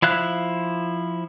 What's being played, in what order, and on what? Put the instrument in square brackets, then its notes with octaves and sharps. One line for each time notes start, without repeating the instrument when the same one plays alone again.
[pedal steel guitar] F3 E4 F5 F#6